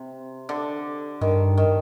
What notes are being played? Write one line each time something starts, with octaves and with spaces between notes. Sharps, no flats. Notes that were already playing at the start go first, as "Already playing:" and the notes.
Already playing: C3
D3
G2 D#3
D#3